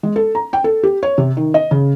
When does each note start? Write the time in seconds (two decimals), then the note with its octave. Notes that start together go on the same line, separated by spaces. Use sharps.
0.03 G#3
0.16 A4
0.35 A#5
0.53 G5
0.64 A4
0.83 G4
1.03 C#5
1.18 C3
1.37 D#3
1.54 D#5
1.71 C#3